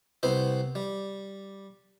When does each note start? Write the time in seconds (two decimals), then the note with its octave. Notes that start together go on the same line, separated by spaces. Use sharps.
0.23 C2 B3 C4 C5
0.75 G3